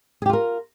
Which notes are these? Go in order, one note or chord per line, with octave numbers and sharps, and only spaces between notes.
F4 G4 G#4 A#4